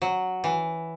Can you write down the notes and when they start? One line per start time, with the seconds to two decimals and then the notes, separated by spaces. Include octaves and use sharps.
0.02 F#3
0.44 E3